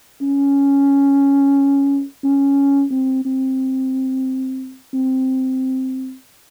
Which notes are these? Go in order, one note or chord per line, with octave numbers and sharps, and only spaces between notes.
C#4
C#4
C4
C4
C4